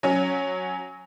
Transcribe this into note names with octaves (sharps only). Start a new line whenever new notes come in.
F#3 C#4